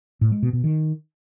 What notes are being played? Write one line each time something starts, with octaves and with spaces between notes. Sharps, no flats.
A2
G#3
B2
B2
D#3